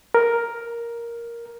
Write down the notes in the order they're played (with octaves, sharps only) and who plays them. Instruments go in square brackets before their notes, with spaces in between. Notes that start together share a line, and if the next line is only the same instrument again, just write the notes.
[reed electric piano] A#4